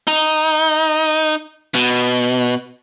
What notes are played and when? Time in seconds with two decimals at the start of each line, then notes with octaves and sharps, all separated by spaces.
0.07 D#4
1.75 B2